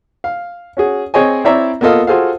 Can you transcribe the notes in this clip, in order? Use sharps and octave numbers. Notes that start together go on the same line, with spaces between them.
F5
C#4 F#4 G#4
C4 G#4 C#5 D#5 G#5
C4 E4 C#5 D5 E5 A#5
A#3 B3 F4 A4 D#5 F5
F4 F#4 G#4 A4 C5 F5